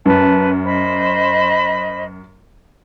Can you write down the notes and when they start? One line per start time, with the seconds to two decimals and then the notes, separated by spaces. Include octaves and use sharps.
0.06 F#2 B4 A5
0.65 C5 D#5 B5